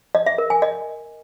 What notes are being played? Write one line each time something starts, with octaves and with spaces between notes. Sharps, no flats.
D#5
E5
A#4
G#5
D#5